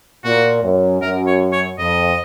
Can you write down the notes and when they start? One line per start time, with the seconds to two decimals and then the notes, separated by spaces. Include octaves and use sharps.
0.24 A#2 F#4
0.62 F#2
1.01 F#2 A#4
1.26 C#5
1.52 C#5
1.78 F2 D#5